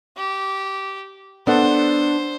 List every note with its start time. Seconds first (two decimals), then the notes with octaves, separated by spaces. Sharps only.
0.17 G4
1.47 B3 D4 A4 C5 F#5